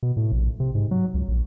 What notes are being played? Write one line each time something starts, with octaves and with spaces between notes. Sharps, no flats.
B2
A2
A#1
C3
G#2
F#3
C#2
A#1